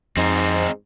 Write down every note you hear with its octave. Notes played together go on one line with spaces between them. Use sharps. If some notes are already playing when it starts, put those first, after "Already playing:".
F2 G#2 C4 D#4